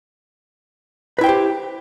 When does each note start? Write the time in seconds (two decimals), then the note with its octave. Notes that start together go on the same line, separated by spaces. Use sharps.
1.18 B4
1.21 E4
1.24 G5
1.26 C5
1.29 G4